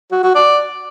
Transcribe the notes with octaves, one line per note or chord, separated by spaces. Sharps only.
F#4
F#4
D5